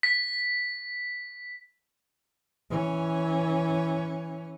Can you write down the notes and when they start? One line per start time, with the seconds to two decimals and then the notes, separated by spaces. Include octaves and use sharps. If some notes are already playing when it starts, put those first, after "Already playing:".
0.03 B6
2.70 E3 C#4